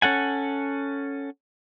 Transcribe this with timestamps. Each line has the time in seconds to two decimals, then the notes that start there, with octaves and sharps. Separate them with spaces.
0.02 C#4 A4 F#5 G#5